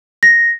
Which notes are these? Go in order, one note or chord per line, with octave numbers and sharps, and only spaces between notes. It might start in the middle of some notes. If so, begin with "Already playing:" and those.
A#6